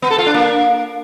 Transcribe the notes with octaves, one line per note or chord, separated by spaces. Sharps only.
B3
A4
F4
D4
A#3